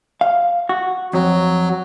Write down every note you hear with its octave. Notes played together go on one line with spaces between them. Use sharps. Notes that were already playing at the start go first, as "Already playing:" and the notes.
F5
F#4
F2 F#3